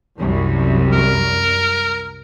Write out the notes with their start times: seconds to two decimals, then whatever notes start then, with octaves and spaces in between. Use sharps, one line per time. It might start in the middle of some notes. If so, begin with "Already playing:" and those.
0.19 C2 F#2
0.92 A#4